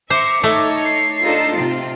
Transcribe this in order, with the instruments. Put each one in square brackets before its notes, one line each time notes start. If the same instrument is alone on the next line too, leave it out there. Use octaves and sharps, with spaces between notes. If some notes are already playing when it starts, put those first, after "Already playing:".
[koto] C5 [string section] E5 A#5 C#7 [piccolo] D6
[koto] A3 [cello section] D#4 [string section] A4 C#5
[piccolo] C7
[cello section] D4 D#4 F4 [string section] A4 C5 A5
[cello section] C3 [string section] C4 F4